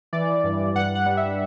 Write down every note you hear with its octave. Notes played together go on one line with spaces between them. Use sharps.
E3 D5
G2
G2 F#5
F#5
G3
E5